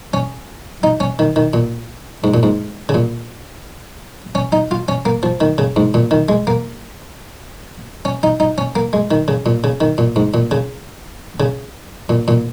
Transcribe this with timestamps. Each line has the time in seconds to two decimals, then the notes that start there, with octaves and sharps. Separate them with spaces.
0.14 C#4
0.83 D#4
1.00 C#4
1.19 D#3
1.36 D#3
1.53 A#2
2.24 G#2
2.34 A#2
2.43 G#2
2.89 C#3
2.94 A#2
4.35 C#4
4.52 D#4
4.71 F4
4.88 C#4
5.06 A#3
5.23 F3
5.41 D#3
5.58 C#3
5.76 G#2
5.94 A#2
6.11 D#3
6.29 G#3
6.47 A#3
8.05 C#4
8.23 D#4
8.40 D#4
8.58 C#4
8.76 A#3
8.93 G#3
9.11 D#3
9.28 C#3
9.46 A#2
9.64 C#3
9.81 D#3
9.98 A#2
10.16 G#2
10.34 A#2
10.51 C#3
11.40 C#3
12.09 A#2
12.28 A#2